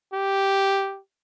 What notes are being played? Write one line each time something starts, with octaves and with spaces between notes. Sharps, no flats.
G4